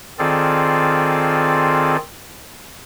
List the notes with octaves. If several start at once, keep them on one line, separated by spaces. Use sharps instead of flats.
D#3 C4 F4 G#4 A4 D5